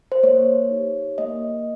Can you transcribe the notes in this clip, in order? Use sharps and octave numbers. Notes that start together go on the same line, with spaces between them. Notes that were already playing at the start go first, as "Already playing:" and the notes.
C5
A#3 C#5
D#4 G4
A#3 D#5